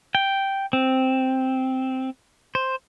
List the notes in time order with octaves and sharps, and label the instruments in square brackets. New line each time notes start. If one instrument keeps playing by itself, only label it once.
[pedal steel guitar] G5
C4
C5